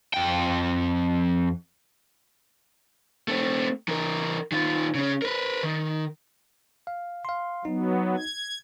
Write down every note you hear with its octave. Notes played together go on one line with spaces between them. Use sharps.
F2 G5
A3 C4
E3 A#4
D#3 F4
C#3 C#4
A#4 B4
D#3
F5
F5 C6
F#3 B3 D#4
G#6